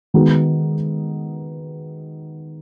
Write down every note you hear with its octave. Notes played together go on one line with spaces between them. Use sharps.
D#3 G#3 B3 D#4 F#4